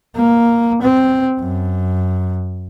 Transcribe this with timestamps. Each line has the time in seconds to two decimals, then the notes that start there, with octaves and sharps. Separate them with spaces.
0.16 A#3
0.82 C4
1.39 F#2